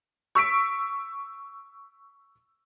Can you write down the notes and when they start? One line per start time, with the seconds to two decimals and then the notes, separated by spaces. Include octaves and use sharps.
0.35 C#6 E6 B6 D7